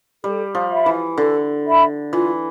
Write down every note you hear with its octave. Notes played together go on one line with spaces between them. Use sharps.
G3 A4
F3
E5 B5
E3
D3 A4
E5 B5
E3 F4